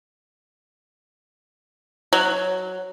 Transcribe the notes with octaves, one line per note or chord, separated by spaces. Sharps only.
F#3